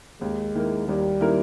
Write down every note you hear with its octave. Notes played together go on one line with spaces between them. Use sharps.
D#2 G#3
D#3 A#3 E4 A#4
D#2 G3
D#3 A#3 E4 A#4